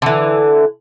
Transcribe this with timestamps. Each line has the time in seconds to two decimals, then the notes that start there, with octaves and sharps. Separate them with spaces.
0.02 D3 E3